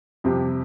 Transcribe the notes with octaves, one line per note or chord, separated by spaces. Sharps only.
F2 C3 G3 C4 G4